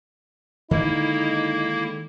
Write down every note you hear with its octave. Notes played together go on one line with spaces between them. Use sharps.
D3 D#3 G#3 A#3 D#4 E4